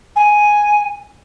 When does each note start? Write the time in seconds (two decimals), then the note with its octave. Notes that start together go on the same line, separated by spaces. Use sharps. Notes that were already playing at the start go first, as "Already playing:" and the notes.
0.16 G#5